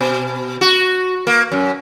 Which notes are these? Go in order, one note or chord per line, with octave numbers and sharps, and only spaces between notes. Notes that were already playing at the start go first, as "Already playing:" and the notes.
B2
F#4
A#3
F#2